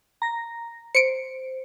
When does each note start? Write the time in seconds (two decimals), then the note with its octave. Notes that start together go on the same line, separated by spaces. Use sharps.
0.22 A#5 A#6
0.95 C5 C#7 D7